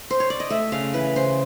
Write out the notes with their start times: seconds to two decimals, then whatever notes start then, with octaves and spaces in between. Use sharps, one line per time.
0.11 C5
0.20 C#5
0.30 D5
0.40 D#5
0.50 A3 E5
0.72 C#3 F5
0.94 E3 B4
1.16 C#3 C5